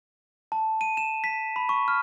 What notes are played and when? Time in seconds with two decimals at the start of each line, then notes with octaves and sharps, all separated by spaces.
0.52 A5
0.81 D#7
0.97 E7
1.24 B6
1.56 B5
1.69 C#6
1.88 F6